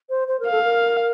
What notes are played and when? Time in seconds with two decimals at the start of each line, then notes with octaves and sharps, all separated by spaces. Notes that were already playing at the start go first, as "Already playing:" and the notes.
0.10 C5
0.28 C5
0.40 A#4
0.47 A4 F5
0.64 A#4